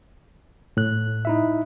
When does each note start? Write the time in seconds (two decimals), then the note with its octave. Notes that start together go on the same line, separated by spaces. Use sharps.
0.77 A2 F#6
1.25 D#4 E4 E5